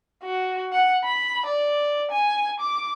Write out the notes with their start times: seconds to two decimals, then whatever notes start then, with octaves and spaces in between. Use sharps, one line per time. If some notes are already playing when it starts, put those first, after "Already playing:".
0.23 F#4
0.73 F#5
1.04 B5
1.46 D5
2.11 G#5
2.59 D6